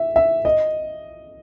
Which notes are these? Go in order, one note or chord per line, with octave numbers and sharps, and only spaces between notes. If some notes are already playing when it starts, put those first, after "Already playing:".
Already playing: E5
E5
D#5